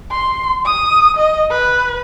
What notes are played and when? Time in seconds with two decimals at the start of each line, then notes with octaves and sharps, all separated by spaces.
0.12 C6
0.65 D#6
1.17 D#5
1.50 B4